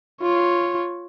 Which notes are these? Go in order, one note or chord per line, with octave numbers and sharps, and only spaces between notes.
F4 C#5